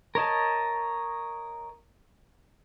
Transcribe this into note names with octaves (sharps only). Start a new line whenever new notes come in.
A#4 C#5 D#5 A5